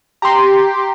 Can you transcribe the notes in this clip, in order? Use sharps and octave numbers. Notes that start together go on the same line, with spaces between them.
G4 A#5 C6